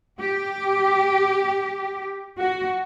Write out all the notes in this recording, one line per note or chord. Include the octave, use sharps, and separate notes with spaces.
G4
F#4